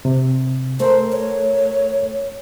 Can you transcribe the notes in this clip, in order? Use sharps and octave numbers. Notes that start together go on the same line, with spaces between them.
C3
A3 A4 A#4 C5
C#5